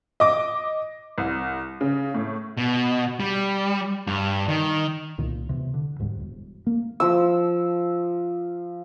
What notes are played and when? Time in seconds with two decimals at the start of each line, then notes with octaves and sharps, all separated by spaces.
0.20 D#5 D6
1.18 C2
1.81 C#3
2.14 A2
2.57 B2
3.20 G3
4.07 G2
4.49 D#3
5.18 C2 A#2 D#3
5.49 E2 C3
5.74 D3
5.99 D#2 G#2 G3
6.20 E1
6.67 A#3
7.00 F3 E6